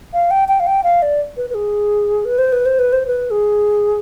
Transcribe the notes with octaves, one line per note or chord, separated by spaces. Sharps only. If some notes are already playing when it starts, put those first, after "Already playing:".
F5
G5
G5
F5
G5
F5
D5
B4
B4
G#4
B4
C5
B4
C5
B4
C5
B4
G#4